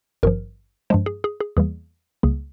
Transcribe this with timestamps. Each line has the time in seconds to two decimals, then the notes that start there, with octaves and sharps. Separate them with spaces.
0.23 G#1 G2 F3 A#4
0.90 G2 F3 G#3 C5
1.06 G#4
1.24 G#4
1.41 G#4
1.57 E2 E3 G3 A#3 G#4
2.23 C#2 C#3 G3 A#3 G#4